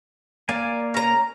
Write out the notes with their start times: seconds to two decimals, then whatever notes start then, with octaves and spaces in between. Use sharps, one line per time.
0.49 A#3 D5 F5 G#5
0.94 C#4 A#5